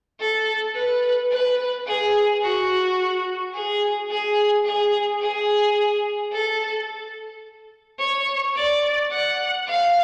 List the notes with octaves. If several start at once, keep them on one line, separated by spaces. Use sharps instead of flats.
A4
B4
B4
G#4
F#4
G#4
G#4
G#4
G#4
A4
C#5
D5
F#5
F5